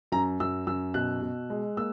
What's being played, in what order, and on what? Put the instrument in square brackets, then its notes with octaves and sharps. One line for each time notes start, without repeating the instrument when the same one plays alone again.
[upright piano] F#2 A#5
F#2 E6
F#2 E6
B2 F#6
B2
G#3
A#3 E6